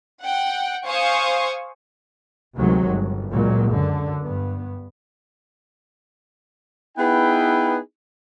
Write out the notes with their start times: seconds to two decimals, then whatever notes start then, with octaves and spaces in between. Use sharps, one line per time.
0.22 F#5 G5
0.87 C5 F5 G#5 C#6 D#6
2.56 D2 C3 D#3 F#3 G#3
2.86 G1
3.31 C#2 A#2 F#3
3.68 F#2 D3
4.22 G2 B3
6.98 B3 D#4 E4 G#4 B4 G5